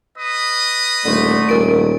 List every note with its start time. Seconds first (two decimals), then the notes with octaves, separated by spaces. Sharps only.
0.17 B4 D#5 D#6
1.05 D#1 D3 A3
1.49 D#1 A#4 D7